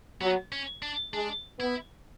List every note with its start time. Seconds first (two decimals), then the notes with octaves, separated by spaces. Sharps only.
0.21 F#3 B3
0.52 C#4
0.82 D4
1.14 G#3 D4
1.59 B3 E4